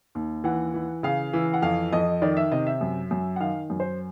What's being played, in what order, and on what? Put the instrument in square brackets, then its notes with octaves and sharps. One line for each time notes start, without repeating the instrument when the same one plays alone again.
[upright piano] D#2
E3 F#5
E3
C#3 F5
E3
F#5
F2 F5
F2 D#5
D#3 D5
E5
C3 D#5
E5
F#2
F#2
F#5
D#3 F5
F#2
C5